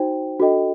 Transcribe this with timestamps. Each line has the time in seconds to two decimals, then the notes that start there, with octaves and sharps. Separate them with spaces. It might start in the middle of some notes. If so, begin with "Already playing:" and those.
Already playing: D#4 F#4 C5 G5
0.40 D4 F#4 A4 D#5 G5